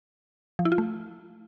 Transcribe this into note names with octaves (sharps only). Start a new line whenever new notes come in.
F3
E4
F4
A3